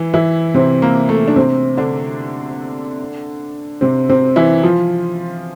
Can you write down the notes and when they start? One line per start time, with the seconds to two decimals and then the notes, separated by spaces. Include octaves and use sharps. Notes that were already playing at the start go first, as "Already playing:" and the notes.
Already playing: E3 E4
0.14 E3 E4
0.54 C3 C4
0.82 A#3
1.09 A3
1.28 D4
1.36 C3 C4
1.77 D3 D4
3.81 C3 C4
4.09 C3 C4
4.36 E3 E4
4.63 F3 F4